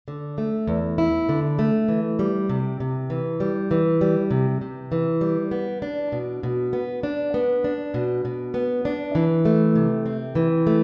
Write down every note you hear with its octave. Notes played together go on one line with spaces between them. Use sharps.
D3
A3
E2
E4
D3
A3
E3
G3
C3
C3
E3
G3
E3
G3
C3
C3
E3
G3
B3
D4
B2
B2
B3
D4
B3
D4
B2
B2
B3
D4
E3
A3
C3
C4
E3
A3